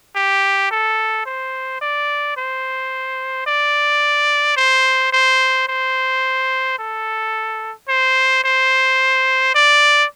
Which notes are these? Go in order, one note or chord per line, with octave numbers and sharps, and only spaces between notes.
G4
A4
C5
D5
C5
D5
C5
C5
C5
A4
C5
C5
D5